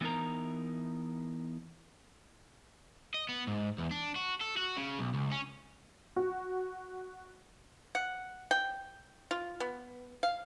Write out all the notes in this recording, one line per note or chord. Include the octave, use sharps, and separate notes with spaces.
E3 B3 D#4 A#4 A#5
D#5
B3
G#2
E2
D4
F#4
A4
F#4
C#3
B1
C#2
C#4
F#4
F#5
G5
F4
B3
F5